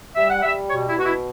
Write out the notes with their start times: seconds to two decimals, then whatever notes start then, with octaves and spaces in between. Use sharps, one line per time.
0.16 G3 E5
0.30 F#5
0.42 G3 E5
0.70 B2 C#5
0.88 E4
0.97 B2 F#4
1.06 E4